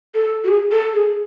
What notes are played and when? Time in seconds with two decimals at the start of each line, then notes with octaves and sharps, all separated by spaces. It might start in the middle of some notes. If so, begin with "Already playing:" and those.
0.15 A4
0.44 F#4
0.48 G#4
0.71 A4
0.94 G#4